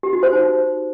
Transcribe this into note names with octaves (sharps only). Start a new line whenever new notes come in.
G4
F#4
C5
D#4